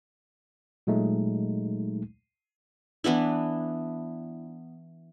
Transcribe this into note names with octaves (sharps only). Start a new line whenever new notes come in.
A#2 F#3 G#3 A3 D#4
E3 B3 D4 E4